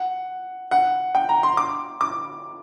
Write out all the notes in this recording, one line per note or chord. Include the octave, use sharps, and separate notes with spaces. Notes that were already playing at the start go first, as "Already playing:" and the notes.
Already playing: F#5
F#5
G5
A#5
C6
D6
D6